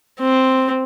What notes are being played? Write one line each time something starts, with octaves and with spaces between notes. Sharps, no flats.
C4